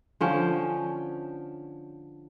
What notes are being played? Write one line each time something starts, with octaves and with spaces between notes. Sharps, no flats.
D3 F3 C#4 G5